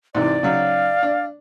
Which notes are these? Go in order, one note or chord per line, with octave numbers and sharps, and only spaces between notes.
G#2 C3 E3 D5
C#3 F#3 D#4 F5
D4